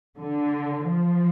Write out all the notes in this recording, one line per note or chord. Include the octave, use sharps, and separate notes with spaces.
D3
F3